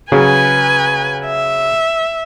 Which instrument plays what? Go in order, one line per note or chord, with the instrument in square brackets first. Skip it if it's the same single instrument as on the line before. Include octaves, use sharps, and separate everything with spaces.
[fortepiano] C#3 F#3 [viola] B4 G#5
[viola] E5